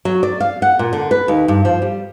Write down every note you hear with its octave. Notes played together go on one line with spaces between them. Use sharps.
F#3
D5
F5
F#5
A#2
D3
B4
D#2
G2
F3
G3